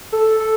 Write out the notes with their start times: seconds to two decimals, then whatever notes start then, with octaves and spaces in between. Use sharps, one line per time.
0.12 A4
0.40 A4